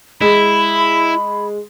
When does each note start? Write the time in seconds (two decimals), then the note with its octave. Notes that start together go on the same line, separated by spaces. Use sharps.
0.21 G#3 E4 B5